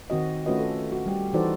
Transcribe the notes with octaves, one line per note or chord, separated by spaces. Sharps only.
D#3 C4 F#4 D#5
A3 C#4 F4 F#4 B4 D#5
A4
F#4
G3 G4
E3 D#4 F#4 A4 C5 D5